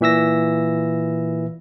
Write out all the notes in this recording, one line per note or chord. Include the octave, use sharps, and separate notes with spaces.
A#2 E3 E5 E6 A#6